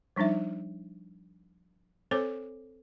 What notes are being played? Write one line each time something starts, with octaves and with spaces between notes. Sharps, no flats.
F3 G3 D4 D#4 E5
C4 A4 C5 C#5 D6